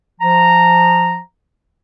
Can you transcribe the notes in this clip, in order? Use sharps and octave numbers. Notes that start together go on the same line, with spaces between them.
F3 A#5